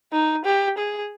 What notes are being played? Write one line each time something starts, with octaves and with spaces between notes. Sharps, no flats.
D#4
G4
G#4